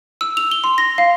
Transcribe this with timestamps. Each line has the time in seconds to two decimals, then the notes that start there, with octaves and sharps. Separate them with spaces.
0.21 E6
0.37 F7
0.51 G7
0.64 C6
0.78 A#6
0.98 F5